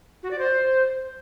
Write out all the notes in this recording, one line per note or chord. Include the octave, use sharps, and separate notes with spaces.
F#4
D5
C5